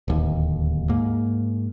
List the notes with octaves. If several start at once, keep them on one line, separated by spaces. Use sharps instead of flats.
D1 D#2
G#2 A#3